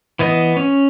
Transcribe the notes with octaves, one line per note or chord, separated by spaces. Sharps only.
E3 B3 D#5
C#4